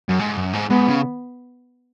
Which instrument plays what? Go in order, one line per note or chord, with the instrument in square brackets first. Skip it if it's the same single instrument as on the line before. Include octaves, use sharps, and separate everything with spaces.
[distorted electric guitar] F#2
G#2
F#2
G#2
[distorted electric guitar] G#2 [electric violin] B3
[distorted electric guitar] C#3